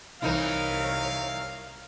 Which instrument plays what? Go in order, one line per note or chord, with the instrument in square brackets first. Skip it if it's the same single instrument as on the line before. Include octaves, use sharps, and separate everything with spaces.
[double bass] C2 [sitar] E3 D#4 E4 [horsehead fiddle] A#4 C#5 [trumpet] F5